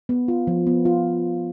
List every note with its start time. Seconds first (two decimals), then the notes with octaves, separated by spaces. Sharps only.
0.09 B3
0.28 F4
0.47 F3
0.67 B3
0.85 F4